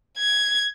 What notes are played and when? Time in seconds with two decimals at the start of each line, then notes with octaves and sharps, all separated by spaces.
0.18 G#6